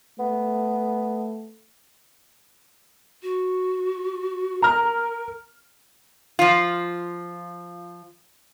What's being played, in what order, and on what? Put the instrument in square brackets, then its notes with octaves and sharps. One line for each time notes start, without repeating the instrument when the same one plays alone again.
[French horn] A3 [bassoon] B3
[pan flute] F#4
[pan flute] A#4 [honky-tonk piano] A#5 F6
[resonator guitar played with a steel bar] F3 F4